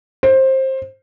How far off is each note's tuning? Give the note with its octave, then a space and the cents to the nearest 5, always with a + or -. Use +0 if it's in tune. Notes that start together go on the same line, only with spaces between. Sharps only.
C5 +20